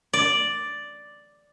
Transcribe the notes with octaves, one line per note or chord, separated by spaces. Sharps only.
D5